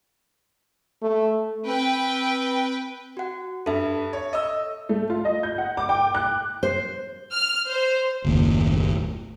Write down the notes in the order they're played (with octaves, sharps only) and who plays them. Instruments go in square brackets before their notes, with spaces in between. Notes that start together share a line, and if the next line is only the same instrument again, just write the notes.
[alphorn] A3
[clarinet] C4 [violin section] B4 G5
[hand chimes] F#4 F#5
[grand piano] G2 [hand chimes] A4 E5
[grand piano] C#5
D#5 E6
[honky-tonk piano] A3
F4
D#5
G6
F#5
D6
G5
F#6
[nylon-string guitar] C5
[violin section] F6
C5
[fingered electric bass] F#1 D#2 A2